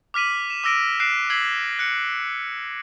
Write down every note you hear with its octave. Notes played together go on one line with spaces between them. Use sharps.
D6 F6 B6 D#7 F#7
E7
D6 E6 A#6 D7 D#7
F#6 C7 D7 E7
E6 G#6 B6 C7 F#7
F#6 C#7